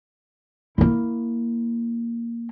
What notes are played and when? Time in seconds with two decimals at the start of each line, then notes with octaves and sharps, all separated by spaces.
0.78 A#3 E4